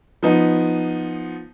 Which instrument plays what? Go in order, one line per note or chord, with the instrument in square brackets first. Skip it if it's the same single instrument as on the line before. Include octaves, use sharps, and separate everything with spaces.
[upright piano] F3 B3 D#4